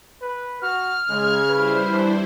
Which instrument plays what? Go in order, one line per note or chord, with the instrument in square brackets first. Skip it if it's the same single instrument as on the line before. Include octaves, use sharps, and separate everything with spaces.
[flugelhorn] B4
[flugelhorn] F#4 [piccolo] F6
[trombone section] C#3 [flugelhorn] G#3 [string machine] G#6
[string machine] G3 E4 C5 [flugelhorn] B4
[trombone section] E3 C4 D4